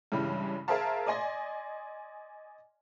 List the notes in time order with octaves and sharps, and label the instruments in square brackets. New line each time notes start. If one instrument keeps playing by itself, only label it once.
[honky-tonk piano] G2 C#3 E3 G3 G#3
G#4 A#4 C5 E5 F5 A5
D5 D#5 G#5 C6 A#6